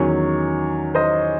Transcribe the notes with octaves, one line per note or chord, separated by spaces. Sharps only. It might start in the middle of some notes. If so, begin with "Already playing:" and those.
Already playing: E2 D#3 F#3 C#4 C#5
C5 D#5